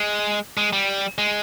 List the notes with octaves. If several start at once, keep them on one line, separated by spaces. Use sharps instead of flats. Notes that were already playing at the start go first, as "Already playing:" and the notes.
Already playing: G#3
G#3
G3
G#3